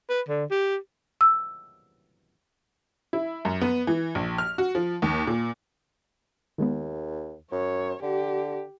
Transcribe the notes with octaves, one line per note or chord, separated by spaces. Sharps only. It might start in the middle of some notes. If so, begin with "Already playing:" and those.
B4
D3
G4
E6
E4
F#2
B3
E3
A#1
F6
F#4
F3
D#2
A#2
D#2 D#3 G#3 B3
F#2 C#5
D3 G4